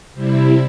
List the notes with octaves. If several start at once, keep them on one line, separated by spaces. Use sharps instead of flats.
C3 G3 C4 E4